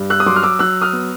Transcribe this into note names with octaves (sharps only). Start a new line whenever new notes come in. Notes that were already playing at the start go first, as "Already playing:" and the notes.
Already playing: G2
E6 F#6
D#6
F#3 C6 D6
F6
D6 E6
F#3 E6 F#6
D#6 F6
B3